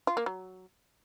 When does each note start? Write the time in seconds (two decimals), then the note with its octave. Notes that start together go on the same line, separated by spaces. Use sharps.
0.07 F4
0.17 A#3
0.26 F#3